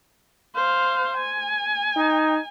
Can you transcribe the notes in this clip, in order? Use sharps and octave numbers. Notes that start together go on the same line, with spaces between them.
C5 F5
G#5
D#4